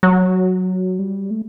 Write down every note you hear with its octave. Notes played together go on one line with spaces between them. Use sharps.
F#3
G3
A3